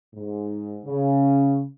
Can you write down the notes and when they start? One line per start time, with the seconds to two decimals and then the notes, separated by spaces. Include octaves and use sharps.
0.14 G#2
0.85 C#3